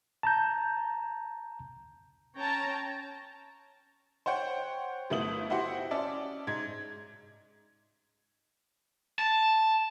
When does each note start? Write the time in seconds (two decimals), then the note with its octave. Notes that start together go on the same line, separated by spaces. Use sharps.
0.23 A5 A#5 G6
2.37 C#4 C#5 G5 A5 A#5
2.72 A5
4.26 C5 C#5 F#5 G5
5.10 G1 A3 B3 E4 D#6 F#7
5.50 E4 F#4 G4 C5 F#5 C6
5.91 C#4 D5 E5 A5
6.47 G#2 G#6
9.19 A5